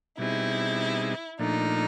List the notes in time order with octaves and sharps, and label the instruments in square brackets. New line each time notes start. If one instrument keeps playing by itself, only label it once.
[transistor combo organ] B2 G3 C4 D#4 G#4 [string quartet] E4
[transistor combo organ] A#2 F3 A3 D4 [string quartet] D#4